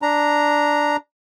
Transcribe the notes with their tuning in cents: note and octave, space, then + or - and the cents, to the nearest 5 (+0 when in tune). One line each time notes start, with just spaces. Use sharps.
D4 +0 A#5 +0